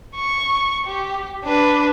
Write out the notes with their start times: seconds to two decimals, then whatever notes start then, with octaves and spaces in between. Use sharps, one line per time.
0.16 C#6
0.86 G4
1.45 D4 B4